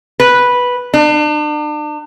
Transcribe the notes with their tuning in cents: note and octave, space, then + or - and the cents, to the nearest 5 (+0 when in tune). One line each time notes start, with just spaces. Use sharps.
B4 -5
D4 +40